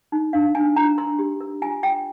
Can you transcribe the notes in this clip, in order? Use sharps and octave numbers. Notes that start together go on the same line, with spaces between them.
D#4
D4 F5
D4 G#5
D4 A#5
A#4 C6
G4
A#4
F4 G#5
F4 G5